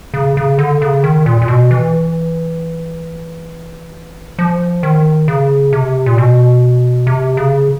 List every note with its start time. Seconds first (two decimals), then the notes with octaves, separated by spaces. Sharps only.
0.14 C#3
0.37 C#3
0.58 D3
0.82 C#3
1.04 D#3
1.26 A#2
1.42 A#2
1.48 B2
1.71 E3
4.39 F3
4.83 D#3
5.28 C#3
5.73 C3
6.06 A#2
6.18 B2
7.07 C3
7.37 C#3